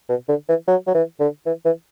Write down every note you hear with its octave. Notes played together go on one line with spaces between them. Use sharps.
B2
D3
E3
F#3
F#3
E3
D3
E3
E3